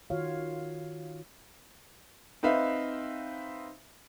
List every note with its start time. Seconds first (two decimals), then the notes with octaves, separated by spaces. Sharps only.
0.10 D#3 F4 F#4 C#5 F5
2.43 C4 D#4 B4 E5 F5